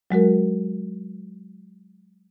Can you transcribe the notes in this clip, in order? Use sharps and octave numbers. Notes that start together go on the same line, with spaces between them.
F#3 G#3 F#4 A#4